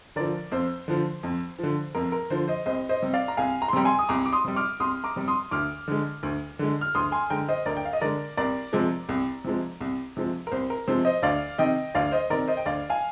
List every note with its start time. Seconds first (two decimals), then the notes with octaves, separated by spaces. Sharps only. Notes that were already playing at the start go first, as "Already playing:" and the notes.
0.16 D3 F3 A#4 D5
0.51 F2 C5
0.88 D3 F3
1.23 F2
1.59 D3 F3
1.95 F2 A#4
2.12 A#4
2.30 D3 F3 C5
2.48 C5 D#5
2.66 C2 C5 D#5
2.89 C5 D#5
3.02 C3 G3
3.14 D5 F5
3.28 A#5
3.37 C2 F5 G#5
3.62 A#5
3.68 C6
3.73 C3 G3 G5 A#5
3.85 G#5 C6
3.99 D#6
4.09 C2 A#5 D6
4.26 D6
4.32 C6 D#6
4.44 C3 G3
4.56 D6 F6
4.80 C2 C6 D#6
5.04 A#5 D6
5.16 C3 G3
5.28 C6 D#6
5.51 D2 D6 F6
5.88 D3 G#3
6.23 D2
6.59 D3 G#3
6.81 F6
6.95 D2 C6 D#6
7.12 G#5 C6
7.30 D3 G#3 G5 A#5
7.49 C5 D#5
7.66 D2 A#4 D5
7.77 G5
7.85 F5
7.93 D#5
8.01 D3 G#3 A#4 D5
8.37 C2 A#4 D5
8.73 C3 F3 G#3
9.09 C2
9.44 C3 F3 G#3
9.81 C2
10.17 C3 F3 G#3
10.47 A#4
10.52 C2 C5
10.70 A#4
10.88 C3 F3 G#3 C5
11.05 C5 D#5
11.23 D2 D5 F5
11.58 C3 D#3 D#5 G5
11.95 D2 D5 F5
12.12 C5 D#5
12.30 C3 D#3 A#4 D5
12.47 C5 D#5
12.57 G5
12.66 D2 D5 F5
12.90 F5 G#5